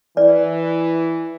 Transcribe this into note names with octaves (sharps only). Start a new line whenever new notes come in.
E3 D5